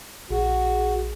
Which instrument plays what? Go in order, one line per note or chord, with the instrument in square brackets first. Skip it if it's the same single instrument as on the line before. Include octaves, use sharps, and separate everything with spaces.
[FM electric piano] A#1 [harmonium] F#4 [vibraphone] G#4